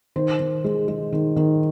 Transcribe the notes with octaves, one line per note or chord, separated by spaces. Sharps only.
D#3 C5
D#3
G#3
G#3
D#3
D#3